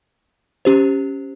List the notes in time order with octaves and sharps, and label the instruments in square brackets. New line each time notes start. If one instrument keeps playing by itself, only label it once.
[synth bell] C#4 G4 C5